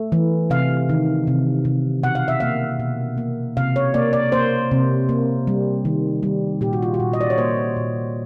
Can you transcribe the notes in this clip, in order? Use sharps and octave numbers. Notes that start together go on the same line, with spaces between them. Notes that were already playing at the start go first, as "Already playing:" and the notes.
Already playing: A3
E3
C3 F5
D#3
C3
C3
B2 F#5
F5
E5
A#3 F5
B2
A#3
C3 F5
C#5
A#3 D5
D5
A#3 C5
C3
A#3
G3
D#3
G3
A#2 G4
F#4
F4
F#4
A#2
D#5
D5
C#5
A#3 C5
A#2